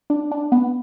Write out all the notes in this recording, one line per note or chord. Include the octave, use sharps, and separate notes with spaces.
D4
D4
B3